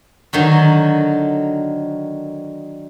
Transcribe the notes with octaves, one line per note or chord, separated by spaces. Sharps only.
D3 D#3 F#3